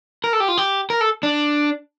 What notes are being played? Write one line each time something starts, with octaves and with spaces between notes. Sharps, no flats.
A#4
A4
G4
F4
G4
A#4
A4
D4